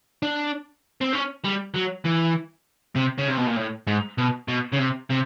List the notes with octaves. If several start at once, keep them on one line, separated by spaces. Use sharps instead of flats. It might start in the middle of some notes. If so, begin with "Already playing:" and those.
D4
C4
C#4
G3
F#3
E3
C3
C#3
C3
B2
A#2
A2
G#2
B2
B2
C#3
C3
C3